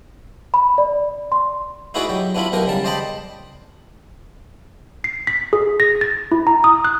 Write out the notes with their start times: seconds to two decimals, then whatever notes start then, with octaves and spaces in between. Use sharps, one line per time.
0.54 B5
0.78 D5
1.32 C6
1.94 D#4 E4 F#4 G#4 B4 D5
2.09 F#3 G4
2.35 B3 D4 E4 F4 B5
2.52 B1 B2 G4 A#4 F#5
2.66 C#3 G3 A5
2.84 C5 D5 D#5 G5 A5 B5
5.04 C7
5.27 B6
5.53 G#4
5.80 A#6
6.01 A6
6.32 E4
6.47 A#5
6.64 D#6
6.85 F#6